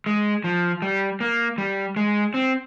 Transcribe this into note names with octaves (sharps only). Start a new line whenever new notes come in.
G#3
F3
G3
A#3
G3
G#3
C4